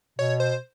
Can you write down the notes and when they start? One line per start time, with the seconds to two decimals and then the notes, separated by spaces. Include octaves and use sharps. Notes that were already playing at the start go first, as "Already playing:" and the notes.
0.19 B2 C#5
0.40 C5